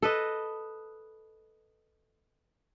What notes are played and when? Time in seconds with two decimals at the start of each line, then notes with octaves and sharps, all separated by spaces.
0.02 A4 B4 D#5